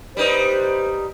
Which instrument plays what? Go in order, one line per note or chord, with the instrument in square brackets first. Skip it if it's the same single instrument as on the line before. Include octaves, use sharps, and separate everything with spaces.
[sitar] G3 D#4 [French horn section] B4 C5